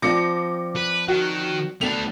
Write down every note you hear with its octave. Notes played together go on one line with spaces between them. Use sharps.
F3 C4 D5 D6 A#6 C#7
B4
D#3 F#4
A3 B3 D4 F#5 A5 F7